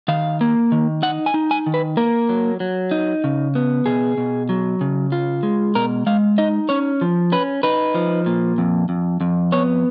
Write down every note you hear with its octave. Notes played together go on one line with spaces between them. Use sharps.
D#3 F5
A#3
D#3
D#4 F#5
G#5
D#4
G#5
D#3
B4
A#3 A#4
F#3
F#3
D#4
C#3
B3
B2 G#4
B2
F#3
C#3
F4
G#3
B2 A#4
G#3 F5
D#4 D#5
C#4 C#5
F3
C#4 B4
D#4 B4
F3
A#2
F2
F2
F2
B3 C#5